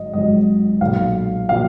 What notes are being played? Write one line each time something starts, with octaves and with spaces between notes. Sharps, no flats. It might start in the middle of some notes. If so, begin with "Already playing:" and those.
Already playing: G#1 G#2 F#3 D#5
G#1 G#2 F#3 D#5
B1 A#2 F#3 F5
A#2 F#3 F5